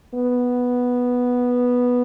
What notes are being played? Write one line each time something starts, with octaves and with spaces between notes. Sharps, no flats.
B3